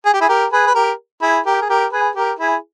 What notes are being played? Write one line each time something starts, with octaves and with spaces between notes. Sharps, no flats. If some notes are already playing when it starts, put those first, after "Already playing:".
G#4
G4
E4 G#4
G4 A#4
G#4 B4
B4
G4 A#4
E4 G#4
G4 A#4
G#4
G4 A#4
G#4 B4
G4 A#4
E4 G#4